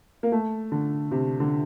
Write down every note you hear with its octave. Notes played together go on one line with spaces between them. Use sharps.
A#3
A3
D3
C3
D3